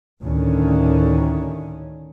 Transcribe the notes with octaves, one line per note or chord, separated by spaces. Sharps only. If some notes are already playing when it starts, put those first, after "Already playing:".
D2 A2 D3 D#3 C#4